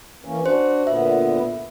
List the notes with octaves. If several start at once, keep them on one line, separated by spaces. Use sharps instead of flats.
E3 A#3 C#4
D4 F#4 C5
A#2 D3 B3 E5